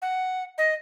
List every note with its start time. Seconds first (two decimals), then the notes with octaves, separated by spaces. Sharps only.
0.02 F#5
0.58 D#5